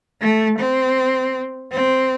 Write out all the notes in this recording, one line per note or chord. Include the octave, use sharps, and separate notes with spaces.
A3
C4
C4